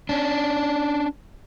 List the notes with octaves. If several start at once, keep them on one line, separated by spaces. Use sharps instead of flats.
C#4 D4